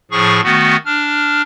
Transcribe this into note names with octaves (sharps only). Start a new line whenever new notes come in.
A2 F3 G#4 C#6
D#3 A3 B3 F#4
D4 F6